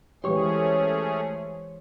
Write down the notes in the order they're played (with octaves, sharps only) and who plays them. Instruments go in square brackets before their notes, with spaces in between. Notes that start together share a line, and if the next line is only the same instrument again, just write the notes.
[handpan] E3 G#3 G4 [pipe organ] A3 C#4 G#4 [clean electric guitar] C5 C#5